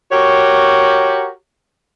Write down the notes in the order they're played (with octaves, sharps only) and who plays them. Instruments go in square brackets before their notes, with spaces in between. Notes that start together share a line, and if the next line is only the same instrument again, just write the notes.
[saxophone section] F#4 G4 A#4 C#5